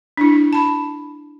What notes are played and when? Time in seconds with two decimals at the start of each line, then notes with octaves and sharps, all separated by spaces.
0.17 D4 E4
0.53 A5 B5